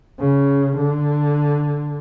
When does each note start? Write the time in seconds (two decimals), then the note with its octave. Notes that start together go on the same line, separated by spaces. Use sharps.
0.20 C#3
0.77 D3